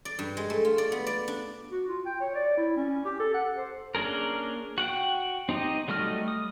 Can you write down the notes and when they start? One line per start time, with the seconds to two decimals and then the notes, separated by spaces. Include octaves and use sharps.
0.05 D5
0.19 G2
0.37 G#3
0.50 A3
0.65 F4
0.78 D5
0.92 B3
1.07 D5
1.28 D4
1.72 F#4
1.88 F4
2.06 G5
2.20 C#5
2.35 D5
2.57 E4
2.77 C#4
3.05 G4
3.20 A4
3.34 F#5
3.56 C5
3.95 A#3 C#4 D4 G#4 A#4
4.78 F#4 F#5 G5
5.49 C4 D#4 G4 D#5
5.88 F#3 G3 A3 D#5 F6
6.28 D#6